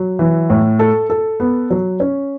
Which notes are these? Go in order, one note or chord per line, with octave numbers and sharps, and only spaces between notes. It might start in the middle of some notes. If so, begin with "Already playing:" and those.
Already playing: F#3
E3
A2
A4
A4
B3
F#3
C#4